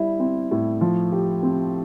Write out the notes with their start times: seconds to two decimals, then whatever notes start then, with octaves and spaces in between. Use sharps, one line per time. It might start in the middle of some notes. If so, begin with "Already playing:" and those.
Already playing: G3 E4
0.20 C4
0.51 A2
0.81 F3
1.12 G4
1.43 C4